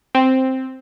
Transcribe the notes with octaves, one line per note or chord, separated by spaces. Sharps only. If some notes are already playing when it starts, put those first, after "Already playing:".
C4